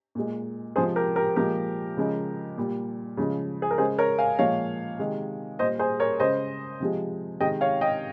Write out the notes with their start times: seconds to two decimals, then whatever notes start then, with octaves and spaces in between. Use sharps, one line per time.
0.15 A#2 G#3
0.76 C3 F3 G#3 G#4 C5
0.96 G4 A#4
1.16 G4 A#4
1.36 A#2 F3 G#3 G4 A#4
1.97 C#3 F3 G#3
2.58 A#2 G3
3.17 C#3 F3 G#3
3.62 G#4
3.71 A#4
3.78 C#3 G#3 G#4 C5
3.98 A#4 C#5
4.18 F5 G#5
4.39 A#2 F3 G#3 C#5 F5
4.99 C3 D#3 G#3
5.59 A#2 G3 C5 D#5
5.79 G#4 C5
6.00 A#4 C#5
6.20 C#3 G#3 C5 D#5
6.80 C3 F3 G#3
7.41 C3 D#3 G#3 D#5 G5
7.61 C#5 F5
7.81 D#5 G5